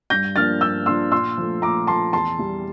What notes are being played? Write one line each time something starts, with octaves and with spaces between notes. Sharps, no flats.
G2 G6 A#6
F3 A#3 D4 F6 A6
G2 E6 G6
F3 A#3 D4 C6 E6
A#2 C6 E6
F3 A3
A#2 A#5 D6
F3 A3 A5 C6
E2 A5 C6
E3 G3